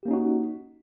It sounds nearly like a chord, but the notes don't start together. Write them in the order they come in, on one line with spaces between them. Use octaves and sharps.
G4 A#3 C#4 D#4 F#4